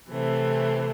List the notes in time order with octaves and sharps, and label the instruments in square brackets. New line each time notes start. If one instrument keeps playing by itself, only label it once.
[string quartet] C3 E3 A3 C4